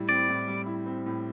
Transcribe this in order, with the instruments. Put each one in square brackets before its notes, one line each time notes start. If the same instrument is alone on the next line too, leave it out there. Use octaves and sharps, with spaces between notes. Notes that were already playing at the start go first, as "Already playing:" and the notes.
Already playing: [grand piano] A2 G3 E4
[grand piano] C4 [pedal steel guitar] D5
[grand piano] A2
G3
E4
C4
A2